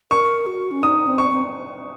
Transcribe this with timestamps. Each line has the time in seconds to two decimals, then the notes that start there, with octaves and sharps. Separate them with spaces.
0.11 A#4 C#6
0.46 F#4
0.71 C#4
0.82 D#4 D#6
1.07 C4
1.18 C#6
1.30 C4